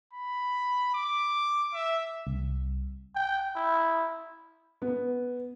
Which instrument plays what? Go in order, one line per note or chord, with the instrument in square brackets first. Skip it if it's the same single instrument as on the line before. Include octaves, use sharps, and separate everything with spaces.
[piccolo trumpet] B5
D6
E5
[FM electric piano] C2
[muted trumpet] G5
E4
[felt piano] B3